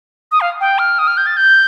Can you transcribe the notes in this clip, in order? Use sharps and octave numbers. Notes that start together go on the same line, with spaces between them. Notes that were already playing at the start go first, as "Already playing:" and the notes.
D#6
F5
G5
F6
D#6
F6
G6
A6
G6